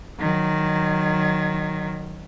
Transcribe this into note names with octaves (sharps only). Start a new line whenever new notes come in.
D#3 F#3